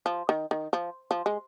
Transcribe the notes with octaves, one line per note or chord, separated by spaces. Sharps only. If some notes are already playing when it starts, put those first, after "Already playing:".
F3
D#3
D#3
F3
F3
G#3